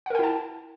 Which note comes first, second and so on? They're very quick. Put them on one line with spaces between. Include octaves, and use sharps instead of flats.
F#5 A#4 G5 E4 A5